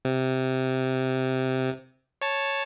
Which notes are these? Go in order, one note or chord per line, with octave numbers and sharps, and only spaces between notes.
C3
C#5 A5